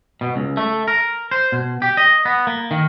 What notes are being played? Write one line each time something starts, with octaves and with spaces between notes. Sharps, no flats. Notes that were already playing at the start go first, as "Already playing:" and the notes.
B2
C#2
A3
A#4
C5
B2
G4
D#5
B3
A#3
D#3